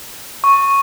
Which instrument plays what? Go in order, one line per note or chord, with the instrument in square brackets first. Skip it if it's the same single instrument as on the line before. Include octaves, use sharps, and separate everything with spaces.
[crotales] C#6